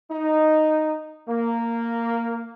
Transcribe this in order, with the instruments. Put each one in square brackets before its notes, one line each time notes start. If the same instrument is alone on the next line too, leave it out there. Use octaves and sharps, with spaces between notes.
[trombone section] D#4
A#3